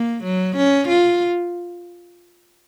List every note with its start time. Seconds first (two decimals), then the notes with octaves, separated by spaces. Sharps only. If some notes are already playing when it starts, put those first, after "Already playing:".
Already playing: A#3
0.24 F#3
0.57 C#4
0.88 F4